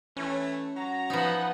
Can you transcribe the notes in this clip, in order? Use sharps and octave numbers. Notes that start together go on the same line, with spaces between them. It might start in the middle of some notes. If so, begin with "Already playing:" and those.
E3 A3 C#4
F#3 F#4 A#5
F3 B3 D#4 F#5